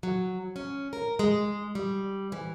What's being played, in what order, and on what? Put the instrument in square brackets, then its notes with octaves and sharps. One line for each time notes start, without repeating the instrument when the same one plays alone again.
[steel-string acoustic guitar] F#3
C#4
A#4
G#3
G3
E3